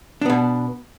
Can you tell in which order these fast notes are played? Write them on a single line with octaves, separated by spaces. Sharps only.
D4 B3 B2